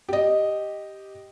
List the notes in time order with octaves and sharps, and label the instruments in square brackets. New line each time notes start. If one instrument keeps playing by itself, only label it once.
[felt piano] G4 D#5